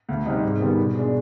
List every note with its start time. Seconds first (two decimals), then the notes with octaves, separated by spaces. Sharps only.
0.09 D2
0.26 C3 G3 C4 D#4
0.43 G#2
0.60 D#3 G3 B3
0.78 B2
0.95 G#3 D4